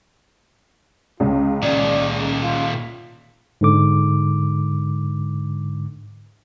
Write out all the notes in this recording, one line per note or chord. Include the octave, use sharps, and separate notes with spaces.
C#2 C#3 F4
A#2 D#3 D5
F4
G#2 D3 D6